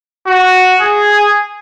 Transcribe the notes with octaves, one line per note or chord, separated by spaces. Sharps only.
F#4
G#4